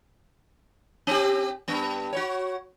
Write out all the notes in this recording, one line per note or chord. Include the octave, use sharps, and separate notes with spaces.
C4 G4
G2 B3
F#4 C#5